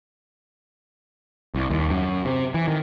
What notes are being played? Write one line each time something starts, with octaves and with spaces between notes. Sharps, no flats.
C2
D#2
F#2
C3
E3
D#3